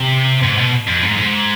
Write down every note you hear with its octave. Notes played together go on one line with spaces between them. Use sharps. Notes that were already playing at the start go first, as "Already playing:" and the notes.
Already playing: C3
G#2
B2
F2
G#2
G#2